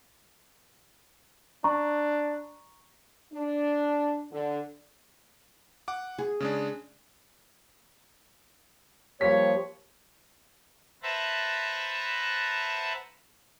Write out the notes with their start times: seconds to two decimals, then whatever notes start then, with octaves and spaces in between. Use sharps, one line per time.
1.64 D4 A#5 C#6
3.34 D4
4.32 D3
5.88 F#5 D6
6.19 G#4
6.40 C#3 G#3 D4
9.21 F3 G3 A#3 G4 C#5 B6
11.02 B4 C5 E5 F#5 A5 A#5